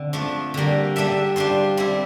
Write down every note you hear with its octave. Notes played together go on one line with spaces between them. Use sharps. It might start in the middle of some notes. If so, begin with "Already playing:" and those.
Already playing: D3 C4
F3 A3 D4 F4
D3 G3 A#3
G3 D4 A4 E5
G3 D4 F4 C5
G3 C4 E4